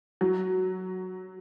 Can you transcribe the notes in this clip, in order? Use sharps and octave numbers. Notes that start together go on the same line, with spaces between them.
F#3